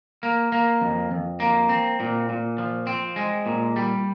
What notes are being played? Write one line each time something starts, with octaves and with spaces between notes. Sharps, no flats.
A#3
A#3
F2
F2
A#3
C4
A#2
A#2
F3
C4
G#3
A#2
G3